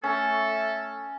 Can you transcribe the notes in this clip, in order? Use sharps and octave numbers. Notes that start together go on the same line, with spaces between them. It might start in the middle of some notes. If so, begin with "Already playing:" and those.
A3 C#4 A4